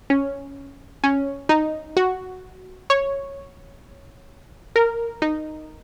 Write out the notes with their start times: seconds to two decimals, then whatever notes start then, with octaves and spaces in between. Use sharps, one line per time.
0.10 C#4
1.04 C#4
1.49 D#4
1.97 F#4
2.90 C#5
4.76 A#4
5.22 D#4